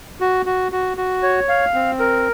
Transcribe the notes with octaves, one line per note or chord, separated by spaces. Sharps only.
F#4
F#4
F#4
F#4
C#5
F5
C4
A#4